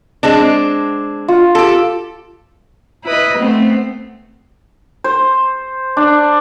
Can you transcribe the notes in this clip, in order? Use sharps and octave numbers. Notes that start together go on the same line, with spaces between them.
G#3 C4 D4
F4 F#4
G4 A4
E4 B4 D#5
A3 B3 C4
C5
D4